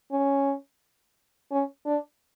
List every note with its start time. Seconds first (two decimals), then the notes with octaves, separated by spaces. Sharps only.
0.11 C#4
1.51 C#4
1.86 D4